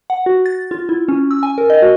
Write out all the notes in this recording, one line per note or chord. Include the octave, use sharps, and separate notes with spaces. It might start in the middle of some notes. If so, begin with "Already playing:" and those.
F#5
F#4
A6
F4
E4
C#4
E6
G#5
A#4
D#5
F#4